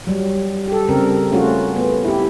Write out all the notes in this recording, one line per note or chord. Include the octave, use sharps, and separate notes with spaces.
F#3 G3
G4 A4
C#3 G3 C4 A#4
A3 C#4 F4 F#4
B3
E4 G4